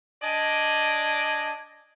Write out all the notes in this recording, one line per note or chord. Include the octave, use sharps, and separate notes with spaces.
D4 D5 D#5 G#5